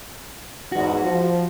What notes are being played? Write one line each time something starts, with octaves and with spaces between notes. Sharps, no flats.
E2 G#2 F#4
F3